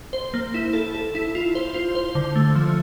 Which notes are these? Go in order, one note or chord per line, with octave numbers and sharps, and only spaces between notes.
C5
A#3
E4
A4
A4
E4
F4
C5
F4
C5
D3
A3
F3